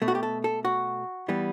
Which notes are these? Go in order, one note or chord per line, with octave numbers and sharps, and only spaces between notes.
B2 A3
F#4
G4
A4
A4
F#4
E3 G3 B3